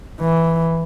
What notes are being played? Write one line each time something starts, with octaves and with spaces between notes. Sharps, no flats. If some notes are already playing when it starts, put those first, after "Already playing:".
E3